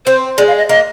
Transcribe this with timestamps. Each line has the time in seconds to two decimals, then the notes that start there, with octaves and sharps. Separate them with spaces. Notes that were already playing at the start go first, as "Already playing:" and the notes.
0.06 C4 C5
0.37 G#3 D5
0.47 F5
0.58 D#5
0.69 A#3 D#5